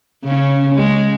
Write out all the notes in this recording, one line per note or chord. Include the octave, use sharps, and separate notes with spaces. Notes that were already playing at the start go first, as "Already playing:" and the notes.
C#3 C#4
G#3